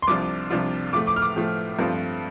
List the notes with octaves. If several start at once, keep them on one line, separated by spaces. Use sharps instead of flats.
C6
C2 C3 F3 D4 F4 D6
C2 C3 F3 D4 F4
A2 F3 A3 D6
D6
F6
D6
A2 F3 A3
G2 F3 A3 C4 F4